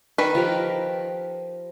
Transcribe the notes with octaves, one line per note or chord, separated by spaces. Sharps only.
D#3 B4
F3 G4 A#4